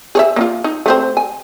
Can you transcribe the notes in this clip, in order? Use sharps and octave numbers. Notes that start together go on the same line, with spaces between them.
G#4 C#5 E5
A#3 D4 F4
D#4
A3 C4 C5
G#5